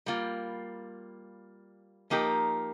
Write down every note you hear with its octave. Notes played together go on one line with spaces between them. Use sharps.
G3 A#3 F4
F3 A#3 D#4 G4 A#4